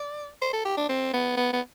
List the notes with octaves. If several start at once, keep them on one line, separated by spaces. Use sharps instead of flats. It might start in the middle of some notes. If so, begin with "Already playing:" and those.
Already playing: D5
C5
A4
G4
D4
C4
B3
B3
B3